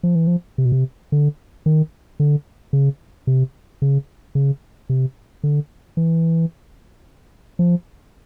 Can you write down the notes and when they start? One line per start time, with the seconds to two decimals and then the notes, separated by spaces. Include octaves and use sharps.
0.03 F3
0.15 E3
0.27 F3
0.58 C3
0.65 B2
0.72 C3
1.12 D3
1.66 D#3
2.20 D3
2.73 C#3
3.27 C3
3.82 C#3
4.35 C#3
4.89 C3
5.43 D3
5.97 E3
7.59 F3